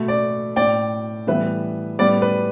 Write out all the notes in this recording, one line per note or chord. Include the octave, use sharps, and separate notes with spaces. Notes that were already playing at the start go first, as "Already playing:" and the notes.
Already playing: B2 A3
D5
A2 A3 D5 G5
A2 E3 G3 B3 B4 E5
A2 G3 B3 D5
B4